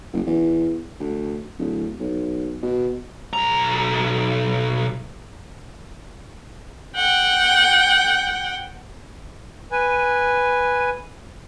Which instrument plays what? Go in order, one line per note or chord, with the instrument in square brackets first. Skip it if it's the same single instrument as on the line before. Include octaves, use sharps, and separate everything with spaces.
[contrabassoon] F#1
E2
D2
D1
B1
B2
[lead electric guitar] B1 A#5
[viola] F#5 G5
[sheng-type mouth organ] B4 G#5